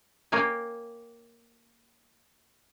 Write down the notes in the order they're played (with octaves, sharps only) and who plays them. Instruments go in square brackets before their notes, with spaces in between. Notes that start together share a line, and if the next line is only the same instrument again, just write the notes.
[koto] A#3 C#5 G5 G#5